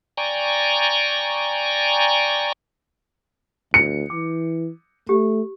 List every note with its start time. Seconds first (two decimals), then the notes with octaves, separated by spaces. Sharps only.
0.17 D5 G5 G#5 A#5 C#6
3.74 D2 C#7
4.10 E3 D6
5.09 A3 G4